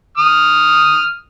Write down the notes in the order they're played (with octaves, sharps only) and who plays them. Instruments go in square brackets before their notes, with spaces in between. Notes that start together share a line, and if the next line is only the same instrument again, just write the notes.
[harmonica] D#6 F6